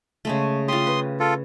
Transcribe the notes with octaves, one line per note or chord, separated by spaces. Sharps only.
C#3 G#3 A3
F4 G4 C6 D#6
B4
F4 A4